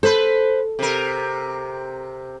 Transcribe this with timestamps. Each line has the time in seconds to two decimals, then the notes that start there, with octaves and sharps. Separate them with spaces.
0.03 A4 B4 C5
0.79 C3 A#4